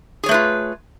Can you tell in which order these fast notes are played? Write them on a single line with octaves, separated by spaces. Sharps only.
G#4 C#5 A3 B4 F4